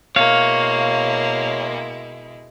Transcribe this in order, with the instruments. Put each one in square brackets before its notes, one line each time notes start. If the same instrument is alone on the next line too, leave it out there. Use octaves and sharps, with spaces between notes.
[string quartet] B2 G#3 E4 [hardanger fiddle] A#3 [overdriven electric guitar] C#5 [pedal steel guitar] F5